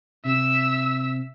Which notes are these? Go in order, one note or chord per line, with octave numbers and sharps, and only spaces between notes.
C3 E5 E6